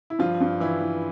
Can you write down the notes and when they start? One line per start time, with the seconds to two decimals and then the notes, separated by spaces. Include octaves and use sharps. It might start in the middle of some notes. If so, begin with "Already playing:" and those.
0.10 E4
0.19 G2 F3 F4
0.40 G2
0.60 E3 E4
0.81 E3